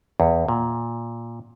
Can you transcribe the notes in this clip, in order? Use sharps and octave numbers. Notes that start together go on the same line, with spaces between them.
E2
A#2